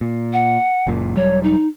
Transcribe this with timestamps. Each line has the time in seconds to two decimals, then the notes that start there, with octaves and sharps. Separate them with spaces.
0.01 A#2
0.33 F#5
0.87 F#1 F#2 A#2
1.17 E1 F#3 G3 C#5
1.43 D#4